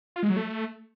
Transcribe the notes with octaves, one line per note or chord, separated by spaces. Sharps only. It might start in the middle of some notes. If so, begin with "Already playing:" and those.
F4
G#3
F#3
A3